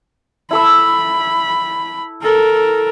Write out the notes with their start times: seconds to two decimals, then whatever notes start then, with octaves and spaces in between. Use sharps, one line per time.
0.51 E4 A4 B5 E6
2.22 A4 A#4